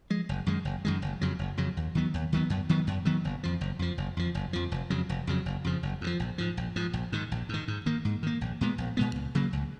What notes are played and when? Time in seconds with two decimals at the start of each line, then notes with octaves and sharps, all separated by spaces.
0.10 F3 G#3
0.29 F#1
0.46 F#2 D#3 G#3
0.65 F#1
0.85 F#2 D#3 G#3
1.02 F#1
1.21 F2 C#3 F#3
1.39 F#1
1.57 F2 C#3 F#3
1.77 D#2
1.95 D#3 F#3 B3
2.14 D#2
2.32 D#3 F#3 B3
2.50 F#2
2.69 D#3 F#3 B3
2.87 F#2
3.05 D#3 F#3 B3
3.25 F#1
3.43 F2 F3
3.61 F#1
3.79 F2 F3
3.98 F#1
4.17 F2 F3
4.35 F#1
4.53 F2 F3
4.72 F1
4.90 F2 C#3 F#3
5.09 F1
5.27 F2 C#3 F#3
5.46 F#1
5.64 F2 C#3 F3
5.83 F#1
6.01 F2 C#3
6.07 F3
6.20 A#1
6.38 G#2 F3
6.57 A#1
6.76 G#2 F3
6.93 A#1
7.12 G#2 D#3
7.32 A#1
7.49 G#2 D#3
7.68 G#2
7.86 D#3 A#3
8.05 G#2
8.23 D#3 A#3
8.41 A#1
8.61 A#2 G#3 B3
8.78 A#1
8.97 A#2 G#3 B3
9.16 C#2
9.35 C#3 F#3 A#3
9.53 C#2